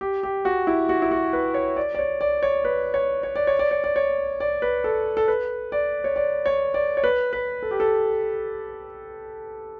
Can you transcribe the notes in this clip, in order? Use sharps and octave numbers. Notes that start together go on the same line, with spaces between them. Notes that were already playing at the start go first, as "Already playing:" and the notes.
G4
G4
F#4
E4
F#4
E4
F#4
B4
C#5
D5
D5
C#5
D5
C#5
B4
C#5
C#5
D5
C#5
D5
C#5
D5
C#5
D5
B4
A4
A4
B4
D5
C#5
D5
C#5
D5
C#5
B4
B4
A4
G4
A4